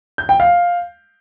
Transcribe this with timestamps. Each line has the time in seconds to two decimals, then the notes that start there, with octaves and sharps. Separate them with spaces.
0.18 G6
0.29 G5
0.40 F5